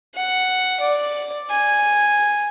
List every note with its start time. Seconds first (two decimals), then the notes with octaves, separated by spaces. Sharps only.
0.15 F#5
0.80 D5
1.50 G#5